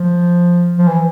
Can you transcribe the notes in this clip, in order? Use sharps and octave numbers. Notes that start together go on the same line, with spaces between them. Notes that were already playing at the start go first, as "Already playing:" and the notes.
Already playing: F3
F3
E3